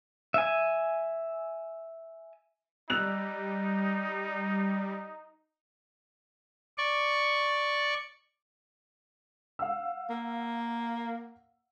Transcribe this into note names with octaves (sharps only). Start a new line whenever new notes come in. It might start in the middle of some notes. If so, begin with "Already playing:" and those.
E5 G#5
G3 D#4 E6 F#6 F7
D5 C#6
F5 F#5 E6
A#3